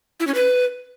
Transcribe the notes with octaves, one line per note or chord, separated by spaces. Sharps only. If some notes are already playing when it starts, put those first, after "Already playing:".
E4
C#4
B4